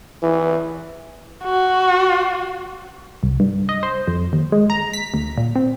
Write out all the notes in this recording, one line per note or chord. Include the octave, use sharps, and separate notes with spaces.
E3
F#4
C2
G2
D#5
C5
F2
D#2
G#3
A#5
B6
D2
A#2
C4